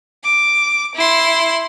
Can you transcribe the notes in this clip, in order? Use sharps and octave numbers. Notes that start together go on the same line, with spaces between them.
D6
E4 C6